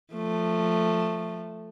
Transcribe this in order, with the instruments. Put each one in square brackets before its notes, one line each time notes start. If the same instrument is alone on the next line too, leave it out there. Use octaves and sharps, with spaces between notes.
[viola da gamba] F3 A3